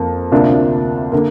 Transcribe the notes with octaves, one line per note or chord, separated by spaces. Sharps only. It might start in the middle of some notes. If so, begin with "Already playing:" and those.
Already playing: F2 A#3
D2 C3 A#3 D4 F4
D3 A#3